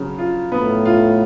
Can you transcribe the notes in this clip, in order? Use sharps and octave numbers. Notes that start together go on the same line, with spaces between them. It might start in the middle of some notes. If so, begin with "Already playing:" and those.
Already playing: C#3 F#3
F4
A2 B3
F4